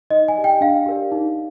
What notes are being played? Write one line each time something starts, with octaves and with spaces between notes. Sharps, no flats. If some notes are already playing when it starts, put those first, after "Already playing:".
D#4 D#5
G#5
G4 D5
G5
D4 F5
G4 A#4 D5
D#4